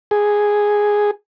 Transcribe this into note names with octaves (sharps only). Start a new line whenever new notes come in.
G#4